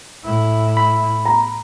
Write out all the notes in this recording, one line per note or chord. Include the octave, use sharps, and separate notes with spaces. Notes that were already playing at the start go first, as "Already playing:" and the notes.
A2 E4
B5
A#5